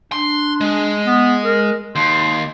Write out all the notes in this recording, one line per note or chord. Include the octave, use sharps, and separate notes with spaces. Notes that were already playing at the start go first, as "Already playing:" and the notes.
D4 C6
G#3
B3
A#4
D#2 C6